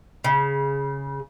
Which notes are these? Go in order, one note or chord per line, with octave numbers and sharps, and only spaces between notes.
C#3